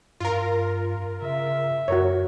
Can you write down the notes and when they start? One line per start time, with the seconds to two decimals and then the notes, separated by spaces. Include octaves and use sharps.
0.20 G2 F4 A#4
1.22 C#3 E5
1.88 F#2 F#4 A#4 C#5